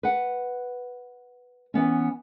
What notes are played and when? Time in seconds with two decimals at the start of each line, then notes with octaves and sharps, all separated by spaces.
0.03 B4 F#5
1.74 E3 B3 C#4